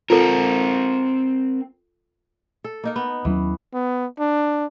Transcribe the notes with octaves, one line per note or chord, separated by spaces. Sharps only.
C4 F4 A4 A#4
A4
A#3 D#4 A#4
B3
D#2 E3 F#3 C#4
B3
D4